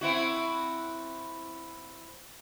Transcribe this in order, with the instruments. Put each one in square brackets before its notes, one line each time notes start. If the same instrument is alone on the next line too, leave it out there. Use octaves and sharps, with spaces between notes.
[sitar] C4 E4 F#4